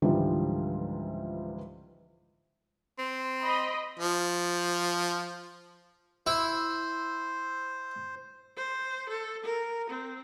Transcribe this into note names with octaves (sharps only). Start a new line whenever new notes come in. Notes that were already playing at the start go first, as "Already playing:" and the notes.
C#2 G#2 D3 E3 F3 G3
C4
D#5 B5
F3
E4 C5
C5
A4
A#4
C4